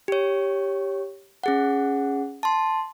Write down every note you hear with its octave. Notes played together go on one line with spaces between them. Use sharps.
G4 C#5
C#4 G#4 F#5
A5 C6